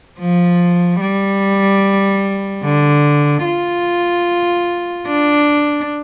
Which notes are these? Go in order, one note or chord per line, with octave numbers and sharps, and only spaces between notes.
F3
G3
D3
F4
D4